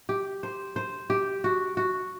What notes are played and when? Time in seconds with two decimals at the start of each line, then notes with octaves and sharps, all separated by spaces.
0.09 G4
0.43 C5
0.76 C5
1.10 G4
1.44 F#4
1.77 F#4